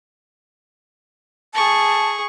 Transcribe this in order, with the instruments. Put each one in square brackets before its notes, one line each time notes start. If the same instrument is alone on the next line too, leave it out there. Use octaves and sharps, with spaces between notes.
[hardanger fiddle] G#4 C#6 [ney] A5